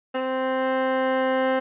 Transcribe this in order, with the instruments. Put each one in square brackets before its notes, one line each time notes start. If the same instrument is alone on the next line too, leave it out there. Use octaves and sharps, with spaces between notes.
[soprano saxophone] C4